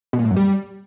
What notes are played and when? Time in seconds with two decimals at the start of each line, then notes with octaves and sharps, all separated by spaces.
0.13 B2
0.19 A#2
0.25 A2
0.31 F#2
0.36 G3